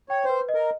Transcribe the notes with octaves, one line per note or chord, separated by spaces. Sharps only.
C#5 G5
B4 C5
D#5
A#4